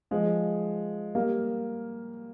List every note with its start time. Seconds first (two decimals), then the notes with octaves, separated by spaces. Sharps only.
0.11 F3 G#3
1.15 G3 A#3